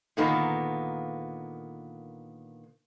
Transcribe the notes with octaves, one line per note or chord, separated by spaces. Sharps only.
A#2 D3 D#3 A#3 B3